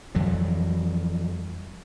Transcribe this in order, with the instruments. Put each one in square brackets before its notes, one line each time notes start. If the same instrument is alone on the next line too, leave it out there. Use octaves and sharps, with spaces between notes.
[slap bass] F2 E3 F#3 G3